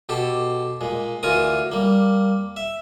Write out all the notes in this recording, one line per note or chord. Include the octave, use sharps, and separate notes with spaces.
B2 G4 A4
A#2 G#3
D2 E3 F4 A#4 G#5 D#6
G3 A#3
E5